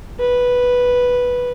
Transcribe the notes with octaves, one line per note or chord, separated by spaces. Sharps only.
B4